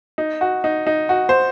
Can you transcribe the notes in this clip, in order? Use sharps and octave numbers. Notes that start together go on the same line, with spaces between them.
D#4
F#4
D#4
D#4
F#4
C5